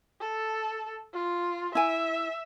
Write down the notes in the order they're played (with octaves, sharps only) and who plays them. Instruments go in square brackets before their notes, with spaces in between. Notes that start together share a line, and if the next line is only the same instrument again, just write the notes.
[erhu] A4
F4
[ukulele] E4 G#5 [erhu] E5